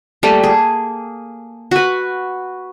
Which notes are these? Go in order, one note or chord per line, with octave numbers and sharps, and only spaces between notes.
G3 A3 A#3
G#4
F#4 B4